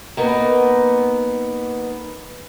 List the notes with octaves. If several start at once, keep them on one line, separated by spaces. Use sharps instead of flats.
A#3 B3 D#4